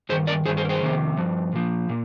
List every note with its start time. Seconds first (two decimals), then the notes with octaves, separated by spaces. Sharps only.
0.09 G2 D#3 G#4 C5
0.27 A#4 D5
0.45 G2 D#3 G#4 C5
0.57 G#4 C5
0.64 A#4
0.69 G#4 C5
0.82 F2 C3 D#3
1.17 G2 F3
1.53 A#2 F3
1.89 A#2